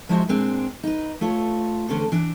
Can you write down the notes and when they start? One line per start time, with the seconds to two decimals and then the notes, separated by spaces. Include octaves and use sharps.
0.09 F3 G#3 E4 F#4 C5 E5
0.29 A#2 G#3 C4 D4
0.83 D#4 B4
1.21 A3 F4 C#5
1.89 E2 D3 C#4 A4 C5
2.12 E3 D4